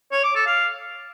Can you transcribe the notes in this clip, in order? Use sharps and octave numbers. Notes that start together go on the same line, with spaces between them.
C#5
D6
A4
F5